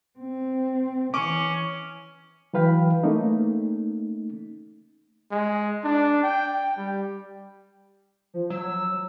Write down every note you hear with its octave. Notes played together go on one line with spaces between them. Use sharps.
C4
E3 C#4 C#6 D6
E3 F#3 B4 F5 G5 B5
A3 A#3 C#4 D#4
G#3
D4
G5
G3
F3
F#3 E6